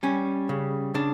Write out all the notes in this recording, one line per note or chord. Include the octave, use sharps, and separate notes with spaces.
G3 C#4
C#3
C#3 D4